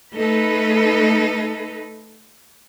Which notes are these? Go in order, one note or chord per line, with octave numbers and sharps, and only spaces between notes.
A3 D#4 A4 B4